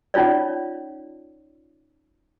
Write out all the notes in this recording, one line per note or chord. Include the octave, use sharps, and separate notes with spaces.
C#4 D#4 F4 C#5 D5